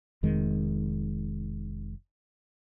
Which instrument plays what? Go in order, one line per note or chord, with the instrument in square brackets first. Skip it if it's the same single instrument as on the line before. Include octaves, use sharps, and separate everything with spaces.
[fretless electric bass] F1 F2 D#3 G#3